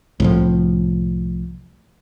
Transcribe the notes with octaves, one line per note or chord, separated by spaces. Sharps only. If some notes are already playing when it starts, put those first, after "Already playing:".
C2 A2 F3